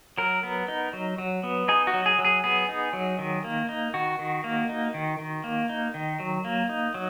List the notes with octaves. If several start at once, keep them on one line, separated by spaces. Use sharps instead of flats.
F#3 A#4
B3
D#4
F#3
F#3
B3
D#4 G#4
F#4
F#3
G#4
F#3
G#4
B3 G#4
D#4
F#3
D#3
A#3
D#4
D#3 F#4
D#3
A#3
D#4
D#3
D#3
A#3
D#4
D#3
F#3
A#3
D#4
F#3